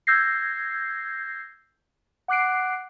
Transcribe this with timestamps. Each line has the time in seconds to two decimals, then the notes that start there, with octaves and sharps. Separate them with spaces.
0.07 E6 G6 G#6 A#6 C7
2.28 F#5 D6 F#6 C7 D7